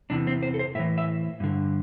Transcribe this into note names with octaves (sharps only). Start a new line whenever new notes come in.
E2 C3 E3 D4
C4
C5
A4
C5
A2 E3 E5
E5
G2 D3